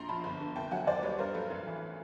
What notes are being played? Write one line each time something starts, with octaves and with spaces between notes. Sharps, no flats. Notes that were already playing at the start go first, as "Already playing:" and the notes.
Already playing: A#1 A#5 C6
F3 A5 B5
G1
D3
C2 G5 A5
F#3 F#5 G#5
D#2 C5 D5
G3 B4 C#5
G2 A#4 C5
F#3 A4 B4
A1
E3